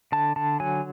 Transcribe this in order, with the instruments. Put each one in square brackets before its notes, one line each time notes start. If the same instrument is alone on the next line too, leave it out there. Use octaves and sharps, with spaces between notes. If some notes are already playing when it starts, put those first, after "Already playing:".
[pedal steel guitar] D3 A5
D3 A5
F#3 G#5